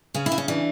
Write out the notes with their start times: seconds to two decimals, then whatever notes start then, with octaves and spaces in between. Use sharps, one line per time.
0.14 C#3 C#4
0.26 E4
0.32 C#3
0.38 C#4
0.48 E3 D4